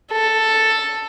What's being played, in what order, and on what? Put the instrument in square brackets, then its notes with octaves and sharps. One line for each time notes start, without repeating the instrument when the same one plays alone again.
[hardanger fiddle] A4